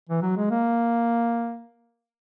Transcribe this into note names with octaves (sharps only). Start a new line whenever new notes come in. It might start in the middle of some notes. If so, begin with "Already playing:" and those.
E3
F#3
G#3
A#3